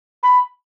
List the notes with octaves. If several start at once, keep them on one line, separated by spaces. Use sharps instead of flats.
B5